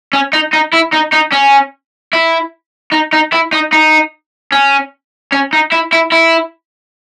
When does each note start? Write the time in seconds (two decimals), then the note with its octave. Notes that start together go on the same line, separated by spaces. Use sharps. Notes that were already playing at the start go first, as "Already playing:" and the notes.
0.13 C#4
0.33 D#4
0.53 D#4
0.73 E4
0.93 D#4
1.13 D#4
1.33 C#4
2.13 E4
2.92 D#4
3.13 D#4
3.33 E4
3.53 D#4
3.72 D#4
4.52 C#4
5.32 C#4
5.53 D#4
5.72 E4
5.93 E4
6.12 E4